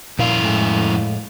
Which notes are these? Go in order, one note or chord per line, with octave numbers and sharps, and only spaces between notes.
F2 A#2 E4 F5
A2 G#3